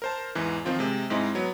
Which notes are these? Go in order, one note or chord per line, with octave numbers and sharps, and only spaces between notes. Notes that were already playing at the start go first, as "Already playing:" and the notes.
A#4 C5 A5
E2 G#2 E3
D#3 F3 C4 F4
C3 G#3
G#2 G#3 C4 D#4 E4
F#3 B3